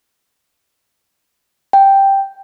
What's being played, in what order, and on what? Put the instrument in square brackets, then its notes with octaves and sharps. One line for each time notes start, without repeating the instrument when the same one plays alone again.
[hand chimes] G5